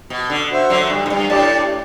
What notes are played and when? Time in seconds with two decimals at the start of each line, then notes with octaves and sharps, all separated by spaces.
0.10 B2
0.30 D3
0.51 F#4 C5 E5
0.70 D3 F#3
0.90 G2
1.06 A2
1.10 G2
1.29 A2 D4 G4 D5 A5